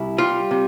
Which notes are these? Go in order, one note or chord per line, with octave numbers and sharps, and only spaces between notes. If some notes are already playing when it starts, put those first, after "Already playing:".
Already playing: C2 E4
G3 F4
C3